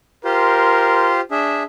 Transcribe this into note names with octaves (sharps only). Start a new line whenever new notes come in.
F4 G4 A#4 C5
D4 G#4 E5